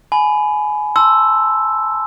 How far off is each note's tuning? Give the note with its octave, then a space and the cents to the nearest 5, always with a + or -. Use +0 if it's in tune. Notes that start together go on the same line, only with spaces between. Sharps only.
G#5 +20 B5 +15
A5 +0 C6 +0 E6 +0